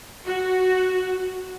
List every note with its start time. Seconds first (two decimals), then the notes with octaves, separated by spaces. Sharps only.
0.25 F#4